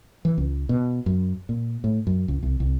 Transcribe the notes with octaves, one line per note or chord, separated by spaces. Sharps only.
E3
C#2
B2
F#2
A#2
A2
F#2
C#2
C2
C2